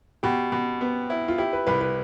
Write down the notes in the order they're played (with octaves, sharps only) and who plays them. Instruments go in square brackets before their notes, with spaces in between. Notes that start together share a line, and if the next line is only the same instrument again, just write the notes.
[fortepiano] B2 [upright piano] G4
[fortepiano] B2
B3
E4
[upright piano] F4
[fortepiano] E4 [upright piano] G4
[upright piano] B4
[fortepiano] C2 [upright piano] B4
[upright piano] B4